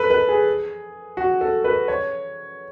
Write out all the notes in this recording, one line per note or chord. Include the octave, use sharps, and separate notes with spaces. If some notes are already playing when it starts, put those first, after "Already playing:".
Already playing: A4 B4
B4
G#4
F#4
A4
B4
C#5